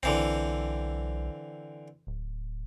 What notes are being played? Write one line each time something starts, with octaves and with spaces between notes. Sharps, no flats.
B1 D3 E3 C4
D1